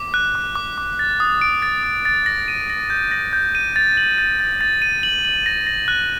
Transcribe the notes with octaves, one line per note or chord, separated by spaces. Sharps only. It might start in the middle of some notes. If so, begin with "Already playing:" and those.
Already playing: D6
F#6
D6
D6
D6
A6
D#6
D7
A6
D#6
A6
A#6
D#7
A#6
G6
A#6
G6
D#7
A6
F#7
A6
A6
A6
D#7
F#7
F#7
A#6
A#6
F#6